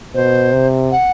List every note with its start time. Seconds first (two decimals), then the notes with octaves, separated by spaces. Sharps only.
0.14 B2 C5
0.53 C3
0.91 F#5